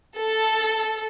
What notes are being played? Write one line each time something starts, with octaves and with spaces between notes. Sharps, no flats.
A4